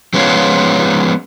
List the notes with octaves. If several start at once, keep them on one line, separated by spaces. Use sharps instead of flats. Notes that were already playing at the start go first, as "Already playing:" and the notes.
F3 G#3 B3 C#4 F4